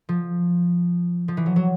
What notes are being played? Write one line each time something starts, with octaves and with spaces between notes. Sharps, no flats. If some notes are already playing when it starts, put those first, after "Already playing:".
F3
F3
E3
F#3
F#3